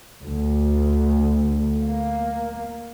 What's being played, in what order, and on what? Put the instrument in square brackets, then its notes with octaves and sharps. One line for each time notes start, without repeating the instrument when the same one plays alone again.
[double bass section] D2
A#3